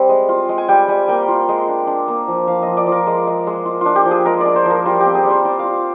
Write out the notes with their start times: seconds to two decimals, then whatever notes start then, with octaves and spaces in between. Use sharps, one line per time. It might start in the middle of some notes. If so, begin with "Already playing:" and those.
Already playing: G3 C4
0.09 G#3
0.29 F4
0.49 G#3
0.58 G#5
0.68 G3 G5
0.88 G3 G#5
1.09 A#3 G5
1.28 F4
1.49 G#3
1.68 D4
1.87 D4
2.08 A#3
2.28 F3
2.47 F3 F5
2.62 F3 D#5
2.77 D5
2.86 F3
2.92 A#4
3.07 G#3
3.27 G#3
3.47 G#3
3.66 F4
3.81 D4 F4
3.96 G4
4.06 F3
4.11 G#4
4.25 G#3 A#4
4.41 D5
4.46 D4
4.56 C5
4.66 F3 A#4
4.85 G3 F4
5.00 C4 G4
5.15 G#4
5.25 G3
5.30 C5
5.45 F4 D5
5.59 F5
5.65 F4